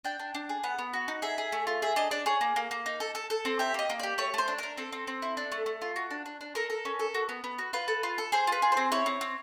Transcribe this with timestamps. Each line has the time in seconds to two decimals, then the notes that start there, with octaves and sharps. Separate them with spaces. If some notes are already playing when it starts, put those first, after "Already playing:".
0.05 D4 G5
0.19 D4
0.34 D4
0.49 G#4
0.64 B3 F#5
0.79 B3
0.93 F#4
1.08 D#4
1.22 G#4 E5
1.38 G#4
1.52 A3
1.67 F4
1.82 G#4 E5
1.96 D4 D#5
2.11 D4 D5
2.26 G#4 C#5
2.41 A#3
2.56 A#3
2.71 A#3
2.86 D#4
3.00 A4
3.15 A4
3.30 A4
3.45 C4
3.59 G4 E5
3.74 A#3 D#5
3.90 A#3
4.00 G4 D5
4.18 A3 C#5
4.34 A3 C5
4.48 D4
4.58 D4 A#4
4.77 C4 A4
4.92 C4
5.07 C4
5.22 E4
5.37 D4
5.52 A3
5.66 A3
5.82 F4
5.96 F#4
6.11 D4
6.26 D4
6.41 D4
6.55 A4 A#4
6.70 A4
6.85 C#4
6.99 A4
7.14 F#4
7.29 B3
7.44 B3
7.59 F#4
7.73 F4 B4
7.88 A4
8.03 F4
8.18 A4
8.32 G#4 C5
8.47 F4 B4
8.62 G#4
8.72 C4 C5
8.92 E4 C#5
9.06 C4
9.21 C4